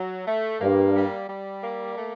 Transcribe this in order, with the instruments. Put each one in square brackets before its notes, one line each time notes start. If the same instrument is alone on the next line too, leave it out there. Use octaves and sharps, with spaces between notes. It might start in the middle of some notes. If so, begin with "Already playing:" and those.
Already playing: [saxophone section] F#3
A3
[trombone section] G2 [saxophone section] A#3
[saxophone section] G3
G3
A#3
A3